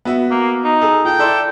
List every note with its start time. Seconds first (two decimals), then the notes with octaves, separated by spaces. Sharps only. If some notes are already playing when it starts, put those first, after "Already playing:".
0.05 B3 F#4 E5
0.31 A#3
0.64 D#4
0.81 G#4 A4
1.05 F4 G5 A5
1.19 E4 A4 D5 C6